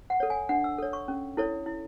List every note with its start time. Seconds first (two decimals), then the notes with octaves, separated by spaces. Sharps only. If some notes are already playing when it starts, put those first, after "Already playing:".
0.10 F#5
0.20 A4 C#5
0.30 G#5
0.49 D4 F#5
0.64 E6
0.79 A4 C#5
0.93 C#6
1.08 C#4
1.37 E4 A4 C#5
1.66 E4